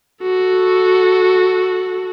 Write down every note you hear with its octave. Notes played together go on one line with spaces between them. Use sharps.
F#4 A4